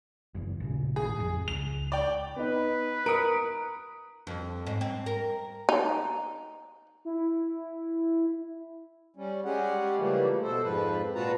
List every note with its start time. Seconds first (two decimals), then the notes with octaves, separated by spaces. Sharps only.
0.35 F#1 E2
0.60 A1 A#2 C#3
0.96 G#1 A2 G#4
1.20 F2
1.48 C#2 F7
1.92 D5 G5
2.36 B3 D#4 B4
3.06 A#4 D#6 C#7 D7
4.27 F2
4.67 G#2
4.81 C4
5.06 A#4
5.69 D#4
7.05 E4
9.16 G3 C#4
9.45 G3 G#3 C#4 G4 G#4 F#5
9.98 C#3 E3 F3 G3 A3 A#3
10.42 B2 A4 C5
10.63 F2 G#2 F3 B4
11.15 A#2 F4 F#4 B4 A5 A#5